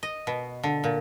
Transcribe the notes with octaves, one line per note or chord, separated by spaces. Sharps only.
D#5
B2
D3
A#2